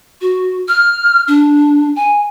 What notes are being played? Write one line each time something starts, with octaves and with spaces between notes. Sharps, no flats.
F#4
F6
D4
G#5